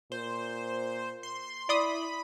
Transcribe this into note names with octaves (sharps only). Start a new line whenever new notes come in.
A#2 C5
C6
E4 D5 B5 C6 D#6